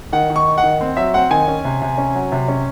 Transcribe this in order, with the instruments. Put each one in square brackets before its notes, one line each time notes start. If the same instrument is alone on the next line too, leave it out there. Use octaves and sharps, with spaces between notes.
[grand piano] D#3 F#5
D#3
C#6
D#4
F#5
D#3
C4
F#3 E5
C4 F#5
D#3 G#5
C#4
C3
C3
C#4
F#3
C3
C#4